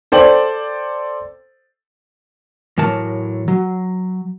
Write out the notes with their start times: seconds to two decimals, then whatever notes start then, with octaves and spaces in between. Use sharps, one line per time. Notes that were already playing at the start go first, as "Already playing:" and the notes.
0.12 A4 C5 D5 G5 F#7
2.78 A2 E3 F#3 A#4 A5
3.48 F#3